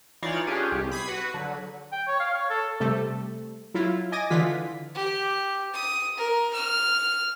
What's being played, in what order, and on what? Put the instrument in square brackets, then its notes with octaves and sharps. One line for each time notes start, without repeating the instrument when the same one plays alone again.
[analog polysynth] E3 D#4 F4 C#5 D5 A6
C#4 D4 F4 G4 G#4
C2 G4
B5 D#6 G#6 B6 C7
F#4 B4
D3 F#3
[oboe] G5
C#5
F5
C#5
A4
[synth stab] C3 G3 A3 A4
F#3 E4 F4
D#5 G#5 D6 A6 A#6 D#7
D3 E3 F4 B6
[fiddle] G4
D#6
A#4
F6